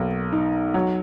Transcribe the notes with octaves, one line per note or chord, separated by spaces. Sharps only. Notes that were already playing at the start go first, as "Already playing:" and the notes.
Already playing: B1 A#3
D#4
F#3